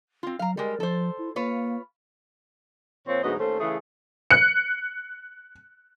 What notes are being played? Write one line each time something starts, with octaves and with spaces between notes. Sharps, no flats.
C4 F4
F#3 F5 A#5
G3 G#3 A#4
F3 A4 C5
E4
A#3 F4 B4 C#5
A#2 F3 C4 C#5
D2 G#2 F#3 B3 D#5
D#2 A3 C#4 A4 C5
C#3 E3 A3 G#4
F#6 C#7